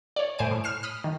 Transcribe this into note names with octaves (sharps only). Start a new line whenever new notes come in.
C#5 D5
A2 C5 G#5 D7
A2
F6 C7 E7
B5 D#6 F6
D#3